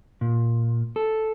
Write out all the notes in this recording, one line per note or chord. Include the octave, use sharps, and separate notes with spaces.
A#2
A4